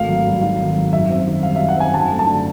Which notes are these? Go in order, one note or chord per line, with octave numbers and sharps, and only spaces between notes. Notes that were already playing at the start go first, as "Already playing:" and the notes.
Already playing: G#1 A3 F5
F#3
G2
D#3 F5
G#1
F#3
F#2 E5
C4
D#3
G3 F5
F#2 E5
F#5
C4 G#5
F#2 A5
A3
A5
D3